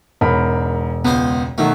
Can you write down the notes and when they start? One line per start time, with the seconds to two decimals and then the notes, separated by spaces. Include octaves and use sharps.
0.21 E1 G#2 A#4 B5
1.05 C#2 B3 C5
1.58 B2 D#3 F#3 A3